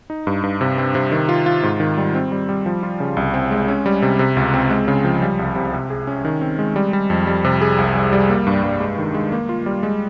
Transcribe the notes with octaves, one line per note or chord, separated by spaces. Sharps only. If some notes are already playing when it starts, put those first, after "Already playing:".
D#4
G2
G2
C3
C4
C3
D#3
F4
F4
G#2
D#3
G3
C4
G3
G3
F3
F4
C#3
C2
C4
G#3
C#4
G3
C3
C3
C#2
C4
G#3
C#3
F3
G3
C2
C3
C3
G#4
C#4
D#3
C4
G#3
G3
G3
F2
G3
C3
G#4
C2
G3
G3
A#3
G2
G2
G#3
D#3
G#3
A#3
F4
G3
G#3